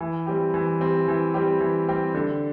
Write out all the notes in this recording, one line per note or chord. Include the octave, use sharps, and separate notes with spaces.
E3
G3 C4 G4
E3
G3 C4 G4
E3
G3 C4 G4
E3
G3 C4 G4
D3